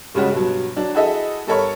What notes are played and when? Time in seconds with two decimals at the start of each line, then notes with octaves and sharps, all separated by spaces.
0.14 G2 C#3 G3 G#3 C#4 F#4
0.33 G2 B2 F#3
0.76 F#3 D4
0.94 E4 F#4 G#4 A4 D#5 E5
1.47 G2 A4 A#4 C#5 B5 C#6